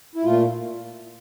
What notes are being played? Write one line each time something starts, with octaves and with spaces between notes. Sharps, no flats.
E4
A#2 A3 F4